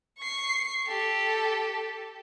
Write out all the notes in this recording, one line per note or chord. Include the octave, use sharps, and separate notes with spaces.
C#6 C7
G4 A4